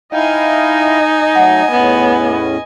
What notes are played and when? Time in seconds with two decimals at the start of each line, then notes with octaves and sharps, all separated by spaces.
0.13 D#4 E4 D#5 F5 G5 G#5
1.35 F#3 A3 F#5
1.71 E2 A2 B3 C#4